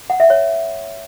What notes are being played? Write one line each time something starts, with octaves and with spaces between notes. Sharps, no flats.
F#5
E5
C#5